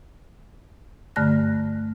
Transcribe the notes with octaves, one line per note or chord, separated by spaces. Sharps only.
G2 D3 A3 F6 F#6 A#6